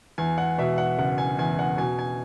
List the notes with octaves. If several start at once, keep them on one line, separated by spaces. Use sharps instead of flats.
E2 G#5
F#5
B2 E5
F#5
F#1 F#5
G#5
E2 G#5
F#5
B2 G#5
G#5